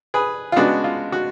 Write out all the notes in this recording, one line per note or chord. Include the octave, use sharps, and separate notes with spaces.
G#4 B4
F4
C#3 G#3 B3 D4 F#4
F4
F#4